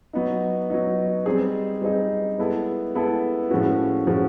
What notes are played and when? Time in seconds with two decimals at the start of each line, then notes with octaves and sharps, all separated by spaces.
0.13 F#3 B3 D#4
0.70 F#3 B3 D#4
1.26 G3 C4 D#4 G#4
1.82 G3 C4 D#4 G#4
2.39 G#3 B3 E4 A4
2.94 G#3 B3 E4 A4
3.50 A2 F3 G#3 C#4 F#4
4.07 A2 F3 G#3 C#4 F#4